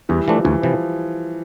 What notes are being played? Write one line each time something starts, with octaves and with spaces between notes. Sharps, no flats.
E2 E3 G3
E3 F3 A3 D4
D2 E3
C3 E3 F3